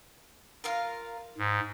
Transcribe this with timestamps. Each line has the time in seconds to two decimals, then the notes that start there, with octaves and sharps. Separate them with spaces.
0.64 F4 A#4 F5
1.38 G#2